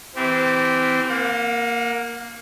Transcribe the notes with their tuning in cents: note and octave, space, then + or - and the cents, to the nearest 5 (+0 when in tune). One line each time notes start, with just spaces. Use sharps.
E3 -15 C4 -25 G4 -5
A#3 +0 F#5 -45